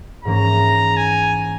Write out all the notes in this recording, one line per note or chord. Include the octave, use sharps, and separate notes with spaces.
G#2 E3 A#3 C#4 A#5
G#5